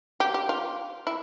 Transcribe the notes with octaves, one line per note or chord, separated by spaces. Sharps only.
G4
G4
F4
E4